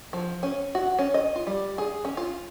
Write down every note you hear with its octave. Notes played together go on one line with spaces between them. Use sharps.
F3
C#4
F#4
C#4
D#5
F4
G3
G#4
C#4
F4